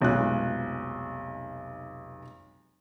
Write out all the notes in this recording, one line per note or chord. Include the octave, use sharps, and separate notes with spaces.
F1 B1 G#3 F4 F#6